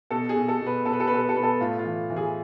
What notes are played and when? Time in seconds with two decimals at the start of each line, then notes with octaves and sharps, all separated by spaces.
0.11 B2 A4
0.29 G#4
0.35 B2
0.48 A4
0.60 B2
0.66 B4
0.85 B2 A4
0.93 B4
1.00 A4
1.07 B4
1.10 B2 A4
1.21 B4
1.29 A4
1.35 B2 B4
1.43 A4
1.60 A2 F4
1.79 F4
1.85 E3
2.10 E3
2.17 G#4